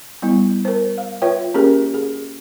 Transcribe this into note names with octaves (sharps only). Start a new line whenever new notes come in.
G3 B3 E4
A#4 C5
F5
F4 B4 C#5 E5 G5
A#3 C#4 G4 G#4 A#4
G#4